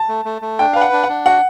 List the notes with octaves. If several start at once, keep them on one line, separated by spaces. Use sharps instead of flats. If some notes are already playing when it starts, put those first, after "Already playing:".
Already playing: A5
A3
A3
A3
D4 G5
B4 F5
F#5
D4
F#5
D4
F#4 F#5